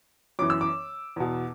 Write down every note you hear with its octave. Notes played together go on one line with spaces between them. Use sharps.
F#2 E3 D6
E6
D6
E2 B2